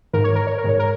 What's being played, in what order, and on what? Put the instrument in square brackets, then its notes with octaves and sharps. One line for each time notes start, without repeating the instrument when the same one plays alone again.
[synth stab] G#2 D#3 A#4
C#5
A#4
C#5
A#4
G#2 D#3 C#5
A#4